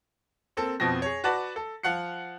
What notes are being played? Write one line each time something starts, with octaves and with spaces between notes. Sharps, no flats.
A#3 C4 A4
F2 B2 F3 C4 A#6
G#4 C#5
F#4 B4 D5 F#5 A5 B5
A4
F3 F5 F#5 F#6 C#7